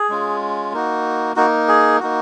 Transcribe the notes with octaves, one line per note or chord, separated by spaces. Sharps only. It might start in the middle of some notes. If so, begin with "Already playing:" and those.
Already playing: G#4
G#3 C#4 F4
A#3 D#4 F#4
A#3 D#4 F#4
G#4
A#3 D#4 F#4